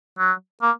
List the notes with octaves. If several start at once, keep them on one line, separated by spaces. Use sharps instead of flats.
F#3
A#3